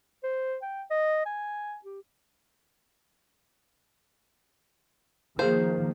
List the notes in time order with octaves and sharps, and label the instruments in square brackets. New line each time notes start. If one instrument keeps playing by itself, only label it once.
[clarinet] C5
G5
D#5
G#5
G4
[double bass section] D#3 F3 A#3 [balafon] G#4 F5 [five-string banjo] C5